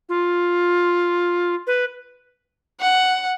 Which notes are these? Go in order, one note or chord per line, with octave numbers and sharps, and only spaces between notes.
F4
B4
F#5